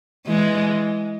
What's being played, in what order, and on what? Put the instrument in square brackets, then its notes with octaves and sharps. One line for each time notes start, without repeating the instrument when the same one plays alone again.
[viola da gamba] E3 G#3